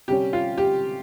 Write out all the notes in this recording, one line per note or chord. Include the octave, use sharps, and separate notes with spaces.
C3 G3 C#4 G4
F4
G4